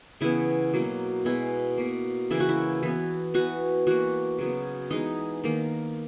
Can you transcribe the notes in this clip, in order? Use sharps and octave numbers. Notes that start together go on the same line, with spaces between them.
C#3 E3 B3 E4
B2 F#3 A#3
B2 G#3 B3 E4
B2 A#3
C#3 E3 A#3 E4
F#4
E4
E3 B3
E3 B3 F#4
E3 A#3 F#4
C#3 F#3 B3
E3 G#3 B3 D#4
D#3 A#3